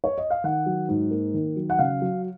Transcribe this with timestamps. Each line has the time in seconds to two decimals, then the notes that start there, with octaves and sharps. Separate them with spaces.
0.04 C#5
0.18 D#5
0.30 F5
0.44 D#3 F#5
0.66 F#3
0.89 G#2
1.11 A#3
1.34 D#3
1.56 F#3
1.70 F#5
1.79 C#3 F5
2.02 F#3